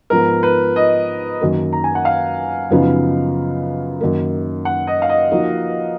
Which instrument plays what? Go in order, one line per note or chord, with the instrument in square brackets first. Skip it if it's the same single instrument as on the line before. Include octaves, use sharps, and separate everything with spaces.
[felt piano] G#2 F3 B3 [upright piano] A#4
[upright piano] B4
D#5
[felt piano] F#2 D#3 F#3 A#3
[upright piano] A#5
G#5
F#5
F5
[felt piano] F#2 C#3 F3 B3 D#4
F#2 D#3 A#3
[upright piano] F#5
D#5
F5
D#5
[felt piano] F3 A#3 D#4 F#4